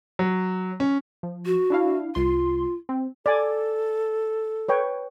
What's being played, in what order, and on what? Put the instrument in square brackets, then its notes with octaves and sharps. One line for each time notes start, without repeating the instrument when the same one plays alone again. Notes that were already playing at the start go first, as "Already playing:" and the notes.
[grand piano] F#3
C#4
[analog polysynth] F3
[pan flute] F#4
[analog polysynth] D4 E4 F5
[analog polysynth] C2 C6 [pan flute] F4
[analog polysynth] C4
[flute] A4 [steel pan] D5 G#5
[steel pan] B4 C#5 G5